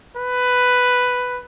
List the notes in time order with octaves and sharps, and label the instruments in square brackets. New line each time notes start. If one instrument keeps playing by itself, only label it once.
[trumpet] B4